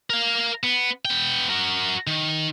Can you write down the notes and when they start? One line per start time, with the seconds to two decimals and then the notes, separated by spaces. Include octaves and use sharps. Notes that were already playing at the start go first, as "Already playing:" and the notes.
0.10 A#4 F5
0.64 B3
1.05 B3 G5
1.50 F#4 A#4
2.07 D#3